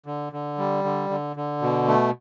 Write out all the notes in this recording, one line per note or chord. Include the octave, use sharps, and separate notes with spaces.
D3
D3
G3
D3
D3
D3
B2
A3